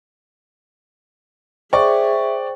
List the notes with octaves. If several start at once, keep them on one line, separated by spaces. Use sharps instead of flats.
G#4 C5 D5 E5 G5 C#6